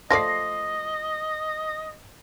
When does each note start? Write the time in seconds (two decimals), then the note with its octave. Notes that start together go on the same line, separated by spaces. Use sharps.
0.11 F3 A3 D5 D#5 A#6 C7